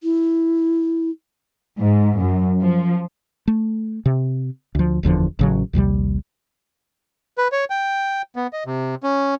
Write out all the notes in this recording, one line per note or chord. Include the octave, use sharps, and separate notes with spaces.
E4
G#2
F#2
F3
A3
C3
D2 F3
F#1 E2 D3 F3
A1 C#3 F#3
A#1 D#2 C3 G3
B4
C#5
G5
B3
D#5
C3
C#4